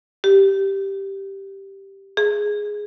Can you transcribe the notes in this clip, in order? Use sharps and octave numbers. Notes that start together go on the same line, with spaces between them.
G4
G#4